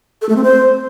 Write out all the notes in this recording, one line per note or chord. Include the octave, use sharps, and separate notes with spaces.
A4
A3
C4
C5